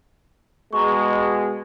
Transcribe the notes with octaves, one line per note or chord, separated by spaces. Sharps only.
B2 G#3 A#5 C#6